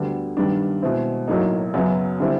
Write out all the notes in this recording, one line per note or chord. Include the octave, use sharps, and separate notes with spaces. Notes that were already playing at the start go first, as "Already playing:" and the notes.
Already playing: D2 D3 G3 B3
G2 D#3 G3 B3 D4
B2 G#3 C4 E4
B1 A2 F#3 A#3 D#4
F#2 C#3 F#3 B3
D3 G3 C4 E4